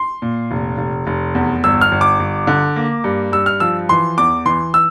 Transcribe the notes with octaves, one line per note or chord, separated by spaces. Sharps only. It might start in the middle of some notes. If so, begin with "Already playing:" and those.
Already playing: C6
A#2
F1
F1
F1
E2
G1 E6
F6
G1
D6
G1
D3
A#3
G2
G2 E6
F6
F3 E6
E3 C6
E2 D6
E3 C6
E6